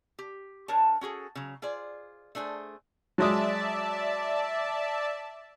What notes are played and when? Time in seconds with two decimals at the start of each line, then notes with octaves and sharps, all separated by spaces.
0.19 G4
0.68 D4 A#4 C#5 A5
1.01 C#4 F#4 G#4 A4
1.35 C#3 F#3
1.62 F4 G#4 C5 D5
2.35 A3 D4 G#4 A#4 C5
3.18 F#3 G#3 D5 E5 A5 D#6